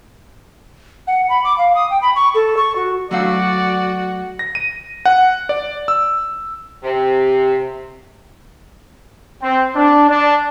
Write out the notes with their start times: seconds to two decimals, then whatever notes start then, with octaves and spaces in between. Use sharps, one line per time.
1.07 F#5
1.29 B5
1.44 D6
1.58 F5
1.75 D#6
1.90 G5
2.02 B5
2.15 C#6
2.35 A4
2.57 C#6
2.76 F#4
3.11 F#3 A3 F#4 D5 F5
4.39 A#6
4.55 D#7
5.05 F#5
5.49 D5
5.88 E6
6.84 C3
9.41 C4
9.75 D4
10.08 D4